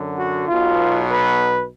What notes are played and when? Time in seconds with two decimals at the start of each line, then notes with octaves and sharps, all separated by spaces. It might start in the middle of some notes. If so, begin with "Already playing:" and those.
Already playing: F#2 D3 F#3
0.18 F#4
0.48 B1 B2 F#3 F4
1.09 B4